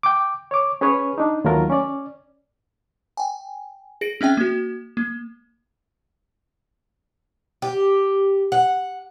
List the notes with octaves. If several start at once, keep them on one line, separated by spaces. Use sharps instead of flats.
G5 D6
C#5 D6
C#4 G#4 B4 C#5
D4 D#4
D#2 F#3 A3 F4 A#4
C#4 D5
G5 G#5
G#4 A#6 D7
C4 C#4 E5 G5
A#3 F#4
A#3
G4
F#5